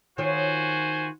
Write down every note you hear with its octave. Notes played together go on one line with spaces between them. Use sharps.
D#3 F4 F#4 C5 C#5 G#5